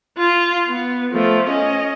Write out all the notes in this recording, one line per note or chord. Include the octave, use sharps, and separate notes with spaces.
F4
B3
F3 A3
C#4 D#5